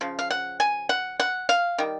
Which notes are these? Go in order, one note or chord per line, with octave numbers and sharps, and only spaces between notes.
C#3 F3
F5
F#5
G#5
F#5
F#5
F5
D#3 G3